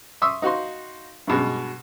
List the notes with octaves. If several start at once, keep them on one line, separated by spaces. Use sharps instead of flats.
E5 C6 C#6 D#6 E6
D#4 F#4 F5 C6
G2 B2 G#3